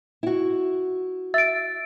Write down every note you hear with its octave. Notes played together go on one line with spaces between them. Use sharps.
E4 F#4
E5 A6 D7